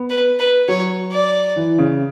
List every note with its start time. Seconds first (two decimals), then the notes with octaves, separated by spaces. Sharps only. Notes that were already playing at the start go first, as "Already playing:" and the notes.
Already playing: B3
0.10 B4
0.39 B4
0.68 F#3 C#5
1.12 D5
1.56 E3
1.78 C#3